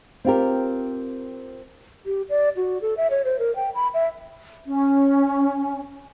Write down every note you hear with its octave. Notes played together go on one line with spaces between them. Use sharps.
C4 F4 G4 A#4
G4
D5
F#4
A4
E5
C#5
C5
A#4
G5
B5
E5
C#4